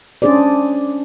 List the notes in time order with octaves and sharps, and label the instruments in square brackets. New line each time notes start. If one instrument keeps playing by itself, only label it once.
[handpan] C#4 D4 G#4 C5 D5